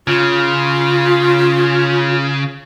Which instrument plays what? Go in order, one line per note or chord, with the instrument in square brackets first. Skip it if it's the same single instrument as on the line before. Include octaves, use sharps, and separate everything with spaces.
[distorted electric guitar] C#3 [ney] F4